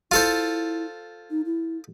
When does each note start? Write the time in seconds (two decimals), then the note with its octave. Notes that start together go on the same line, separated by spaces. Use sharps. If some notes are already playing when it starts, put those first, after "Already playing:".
0.12 E4 F4 A4 C5
1.31 D#4
1.45 E4